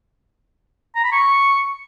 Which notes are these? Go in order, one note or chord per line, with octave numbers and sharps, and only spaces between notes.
A#5
B5
C#6